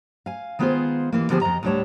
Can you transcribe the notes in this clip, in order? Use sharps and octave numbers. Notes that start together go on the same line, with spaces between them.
F5 G#5
D#3 G#3 B3 F4 G#4 C5
D#2 E3 A#3
D3 F3 B3 G4 G#4 C5
F2 F#3 D#5 A#5
D2 A2 D3 G3 C#5 A5